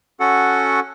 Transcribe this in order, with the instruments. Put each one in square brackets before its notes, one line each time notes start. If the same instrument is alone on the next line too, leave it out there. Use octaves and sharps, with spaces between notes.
[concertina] C#4 F#4 A4 F#5